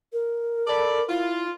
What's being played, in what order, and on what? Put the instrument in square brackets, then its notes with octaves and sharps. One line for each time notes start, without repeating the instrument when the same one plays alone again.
[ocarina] A#4
[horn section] A4 D5 B5
[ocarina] E4 [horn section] F4